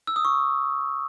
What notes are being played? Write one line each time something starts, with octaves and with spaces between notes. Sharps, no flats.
E6
D#6
C#6